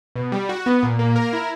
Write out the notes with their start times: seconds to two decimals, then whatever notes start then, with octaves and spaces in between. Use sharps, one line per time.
0.16 B2
0.32 G3
0.49 F#4
0.66 B3
0.83 A#2
0.99 A#3
1.16 A#4
1.33 E4